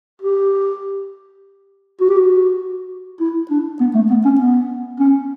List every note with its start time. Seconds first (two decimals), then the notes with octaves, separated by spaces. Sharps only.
0.22 G4
2.01 F#4
2.09 G4
2.17 F#4
3.20 E4
3.51 D4
3.81 B3
3.95 A3
4.10 B3
4.25 C#4
4.41 B3
5.00 C#4